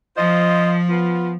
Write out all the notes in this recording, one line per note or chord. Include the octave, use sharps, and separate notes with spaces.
F3 F4 C5 D#5
B3 F4